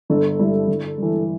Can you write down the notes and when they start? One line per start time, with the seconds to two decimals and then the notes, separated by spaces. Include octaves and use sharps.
0.09 G1 A4
0.39 G2 G3 E4
0.68 G1
0.98 G2 E3